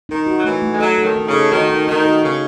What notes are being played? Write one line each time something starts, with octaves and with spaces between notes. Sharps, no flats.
D#3 D#4
F#4
F#3
E3 A3
A3
G#3
F#3 A4
A4
D#3
D#4
C#3
A4
D#3 F#4
D#4
D#3 D#4
F#4
C#3 D#4